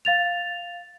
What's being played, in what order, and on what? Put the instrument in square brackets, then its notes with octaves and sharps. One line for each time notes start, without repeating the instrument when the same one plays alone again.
[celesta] F5 A6 F7